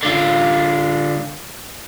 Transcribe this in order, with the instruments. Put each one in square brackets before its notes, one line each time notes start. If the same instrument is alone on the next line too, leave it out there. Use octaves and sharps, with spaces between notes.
[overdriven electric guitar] D3 F4